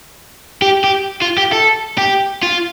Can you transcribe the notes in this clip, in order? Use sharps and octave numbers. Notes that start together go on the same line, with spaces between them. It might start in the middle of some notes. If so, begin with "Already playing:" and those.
G4
G4
F4
G4
A4
G4
F4